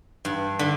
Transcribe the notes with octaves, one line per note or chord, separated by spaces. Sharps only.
G2
D3